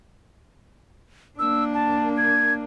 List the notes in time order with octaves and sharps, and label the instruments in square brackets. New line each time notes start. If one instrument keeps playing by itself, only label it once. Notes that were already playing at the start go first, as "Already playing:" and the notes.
[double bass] A#3 D4 [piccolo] E6
[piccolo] A5
G#6